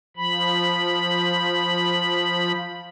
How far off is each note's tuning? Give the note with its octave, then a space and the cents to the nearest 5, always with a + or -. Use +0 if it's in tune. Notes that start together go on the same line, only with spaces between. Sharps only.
F3 +0 B5 -5